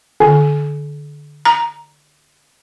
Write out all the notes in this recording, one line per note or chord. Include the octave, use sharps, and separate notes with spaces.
D3
A#5